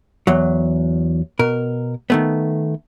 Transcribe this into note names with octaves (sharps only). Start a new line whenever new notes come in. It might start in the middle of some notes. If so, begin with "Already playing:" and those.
E2 F#3
B2 A#4
D#3 A3 B3